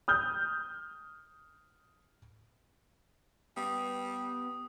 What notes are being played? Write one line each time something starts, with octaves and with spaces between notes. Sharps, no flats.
D#6 F6 G6
G3 B3 D#6